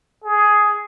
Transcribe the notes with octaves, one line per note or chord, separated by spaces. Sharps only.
G#4